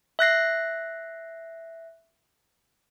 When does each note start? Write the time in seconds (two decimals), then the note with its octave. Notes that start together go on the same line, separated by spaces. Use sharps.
0.19 E5 F#6 A#6 C7